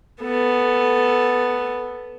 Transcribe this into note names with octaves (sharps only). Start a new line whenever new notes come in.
B3 A4